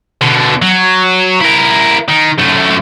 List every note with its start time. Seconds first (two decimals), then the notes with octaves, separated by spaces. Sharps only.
0.21 B2 D3
0.62 F#3
1.41 E4 A#4
2.09 D#3
2.39 F#2 A3